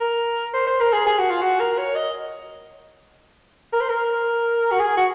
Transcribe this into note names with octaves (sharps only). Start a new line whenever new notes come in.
A#4
C5
C5
A#4
G#4
G#4
F#4
F4
F#4
A#4
C#5
D#5
A#4
C5
A#4
F#4
G#4
F#4